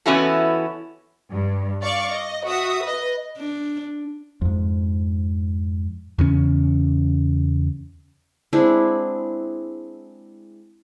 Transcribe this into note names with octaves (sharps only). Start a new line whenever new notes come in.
E3 B3 C#4 E4 F#4 A4
G2
D5 F5 C#6 D6
D#5
F#4 E5 D#6
B4 D#5
D4
F2 G#2
E2 C#3 C#4
G#3 C4 D4 E4